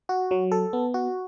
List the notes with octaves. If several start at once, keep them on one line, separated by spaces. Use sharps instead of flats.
F#4
F#3
A4
B3
F#4